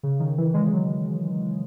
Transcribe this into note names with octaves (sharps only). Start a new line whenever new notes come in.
C#3
D#3
E3
G#3
F#3